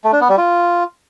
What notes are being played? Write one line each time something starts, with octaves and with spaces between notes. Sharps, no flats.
A3
D4
B3
G3
F4